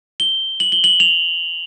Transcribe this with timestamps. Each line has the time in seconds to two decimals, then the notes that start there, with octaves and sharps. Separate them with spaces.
0.20 G7
0.60 F#7
0.72 G7
0.84 F#7
1.00 F7